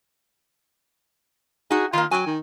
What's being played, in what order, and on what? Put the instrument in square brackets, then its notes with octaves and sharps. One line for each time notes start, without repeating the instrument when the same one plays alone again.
[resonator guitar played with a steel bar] D#4 F#4 [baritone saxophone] G#4
[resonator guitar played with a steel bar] D#3 A#3 [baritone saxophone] F4
[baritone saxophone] F#3 [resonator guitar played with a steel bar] G5 G#5
[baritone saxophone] D#3